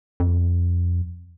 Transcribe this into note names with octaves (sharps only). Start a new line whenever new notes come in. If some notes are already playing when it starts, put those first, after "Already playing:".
F2